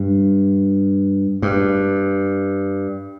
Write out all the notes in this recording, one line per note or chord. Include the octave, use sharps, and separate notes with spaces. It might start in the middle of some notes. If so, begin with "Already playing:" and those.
Already playing: G2
G2